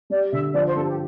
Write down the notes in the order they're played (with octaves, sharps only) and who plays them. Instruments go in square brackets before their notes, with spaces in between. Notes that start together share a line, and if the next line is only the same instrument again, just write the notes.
[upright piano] G3 [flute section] D5
[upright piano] D3 [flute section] E5
[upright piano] F3 [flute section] D5
[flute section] C5
[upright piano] G2 [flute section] A4
[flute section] G4